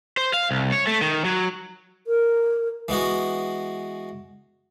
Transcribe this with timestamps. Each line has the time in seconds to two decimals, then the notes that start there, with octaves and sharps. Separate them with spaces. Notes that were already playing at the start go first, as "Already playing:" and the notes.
0.17 C5
0.34 F5
0.51 C2
0.72 C#5
0.87 A3
1.01 D#3
1.25 F#3
2.07 A#4
2.88 E3 G#3 B3 F#4